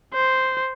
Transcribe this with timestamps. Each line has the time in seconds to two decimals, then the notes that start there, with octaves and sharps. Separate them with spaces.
0.14 C5